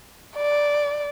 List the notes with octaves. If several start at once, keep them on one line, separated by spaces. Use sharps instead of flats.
D5